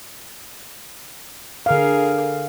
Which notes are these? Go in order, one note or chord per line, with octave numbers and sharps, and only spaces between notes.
D3 G#4 A#4 F5